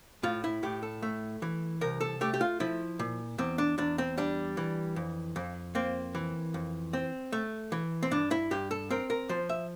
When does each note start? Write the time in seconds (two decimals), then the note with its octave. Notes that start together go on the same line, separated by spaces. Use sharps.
0.23 A2 F4
0.44 E4
0.63 A2 G4
0.83 A4
1.02 A3
1.42 E3
1.81 C2 A#4
2.01 A4
2.21 A3 G4
2.33 G4
2.41 F4
2.60 F3 E4
2.99 A#2
3.38 E2 C4
3.58 D4
3.78 E2 D4
3.98 C4
4.18 G3 D4
4.57 E3
4.96 F2
5.36 F2
5.75 A#3 C4
6.15 E3
6.54 F2
6.93 C4
7.32 A3
7.72 E3
8.03 C4
8.11 G2 D4
8.31 E4
8.51 G2 G4
8.71 A4
8.90 C4 A#4
9.10 A#4
9.29 F3 C5
9.49 E5